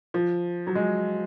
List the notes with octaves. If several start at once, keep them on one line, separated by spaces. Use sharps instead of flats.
F3
F#3
G#3